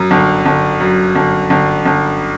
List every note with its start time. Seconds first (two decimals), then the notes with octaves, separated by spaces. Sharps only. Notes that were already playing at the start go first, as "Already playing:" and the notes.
Already playing: F#2
0.11 G1
0.46 G1
0.80 F#2
1.15 G1
1.50 G1
1.85 G1